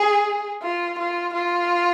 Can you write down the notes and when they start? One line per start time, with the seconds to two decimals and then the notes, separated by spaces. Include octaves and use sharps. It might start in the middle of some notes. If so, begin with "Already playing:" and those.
Already playing: G#4
0.62 F4
0.98 F4
1.33 F4